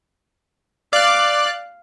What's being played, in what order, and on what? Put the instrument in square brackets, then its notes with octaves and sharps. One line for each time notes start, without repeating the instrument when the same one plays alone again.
[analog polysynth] D5 F#6 [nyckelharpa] F5